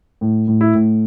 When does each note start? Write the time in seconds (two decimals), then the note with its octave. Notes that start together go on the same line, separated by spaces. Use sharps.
0.21 A2
0.48 A2
0.61 E4
0.75 A2